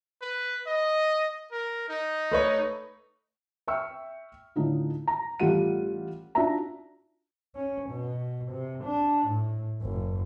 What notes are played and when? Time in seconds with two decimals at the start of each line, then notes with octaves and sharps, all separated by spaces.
0.22 B4
0.67 D#5
1.52 A#4
1.89 D#4
2.31 A3 B4 C#5
3.68 E5 G5 C#6 E6 F6
4.56 A2 D3 D#4 F4
5.08 A#5
5.40 A1 G3 A3 F4 F#5 D#7
6.35 D4 D#4 F4 F#4 E5 A#5
7.55 C#4
7.90 B2
8.52 C3
8.85 D4
9.27 A2
9.81 F#1